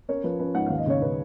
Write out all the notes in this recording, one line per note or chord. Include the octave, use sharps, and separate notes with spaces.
C#4 A#4 C#5
F3 B4
C#4 B4
G#2 F#5
D#2 F5
D#5
C#3 C#5
C#3 B4